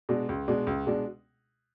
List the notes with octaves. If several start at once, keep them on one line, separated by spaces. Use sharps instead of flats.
B2 G#3 D4
C#2
B2 G#3 D4
C#2
B2 G#3 D4